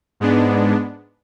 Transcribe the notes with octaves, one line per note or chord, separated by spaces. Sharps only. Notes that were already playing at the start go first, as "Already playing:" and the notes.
G#2 G#3 B3 D4